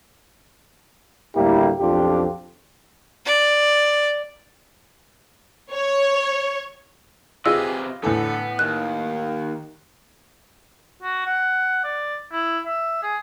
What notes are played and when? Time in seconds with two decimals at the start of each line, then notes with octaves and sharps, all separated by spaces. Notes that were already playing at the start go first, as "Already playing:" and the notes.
1.36 D2 A2 G3 A#3 E4 G4
1.80 B1 F2 D4 F4 G4
3.25 D5
5.73 C#5
7.46 C3 F4 G4 G#4 B4 D#5 E6
8.03 A2 D3 E3 B3 A4
8.59 D#2 D#3 F#6
11.02 F#4
11.26 F#5
11.84 D5
12.32 E4
12.66 E5
13.03 G#4